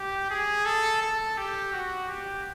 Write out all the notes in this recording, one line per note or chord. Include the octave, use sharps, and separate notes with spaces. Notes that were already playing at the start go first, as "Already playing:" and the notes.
Already playing: G4
G#4
A4
A4
G4
F#4
G4